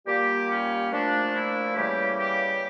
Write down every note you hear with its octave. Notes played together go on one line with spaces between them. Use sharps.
A#2 G3 A#3 G4
C#4
A#2 F3 A3 D4
E4
C#3 E3 G3 A#3 G4
G4